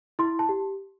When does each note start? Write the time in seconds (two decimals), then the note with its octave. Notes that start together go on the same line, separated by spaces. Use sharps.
0.19 E4 C6
0.39 A5
0.49 G4